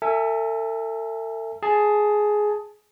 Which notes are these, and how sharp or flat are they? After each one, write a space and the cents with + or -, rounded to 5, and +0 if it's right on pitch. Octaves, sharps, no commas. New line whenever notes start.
A4 +40 E5 +5 G#5 +0
G#4 +10 A5 +0